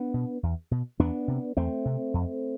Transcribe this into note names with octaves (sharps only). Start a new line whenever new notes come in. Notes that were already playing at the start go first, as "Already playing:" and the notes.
Already playing: B3 D4
B2
E2
B2
E2 B3 D4
C3
E2 A3 C4
C3
F2